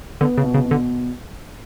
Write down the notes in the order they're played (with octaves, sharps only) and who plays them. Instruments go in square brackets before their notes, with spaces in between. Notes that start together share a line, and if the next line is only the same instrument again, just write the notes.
[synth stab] D3 [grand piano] B3
[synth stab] C#3
[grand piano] B2
[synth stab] C#3
[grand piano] B2
[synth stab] D3